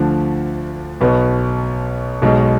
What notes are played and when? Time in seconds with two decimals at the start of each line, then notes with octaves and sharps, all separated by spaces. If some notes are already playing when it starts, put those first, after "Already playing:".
Already playing: D2 D3 F3
1.01 B1 B2 B3
2.22 B1 B2 G#3